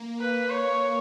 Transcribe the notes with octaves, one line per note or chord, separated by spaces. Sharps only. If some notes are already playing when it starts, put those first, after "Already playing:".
Already playing: A#3
B4
C#5